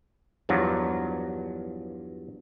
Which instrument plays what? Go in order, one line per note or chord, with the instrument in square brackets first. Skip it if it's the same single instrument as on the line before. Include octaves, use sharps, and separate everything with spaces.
[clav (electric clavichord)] E2 G2 F3 F#3